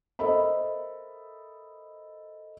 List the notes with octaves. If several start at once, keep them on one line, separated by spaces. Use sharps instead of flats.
A4 A#4 C5 D#5 E5 B5